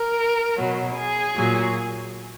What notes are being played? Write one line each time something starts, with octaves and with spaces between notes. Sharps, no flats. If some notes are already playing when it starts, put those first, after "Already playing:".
Already playing: A#4
B2 F#3
G#4
A#2 F#3